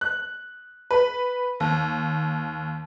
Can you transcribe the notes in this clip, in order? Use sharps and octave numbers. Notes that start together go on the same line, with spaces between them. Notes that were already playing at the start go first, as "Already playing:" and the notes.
F#6
B4
D#2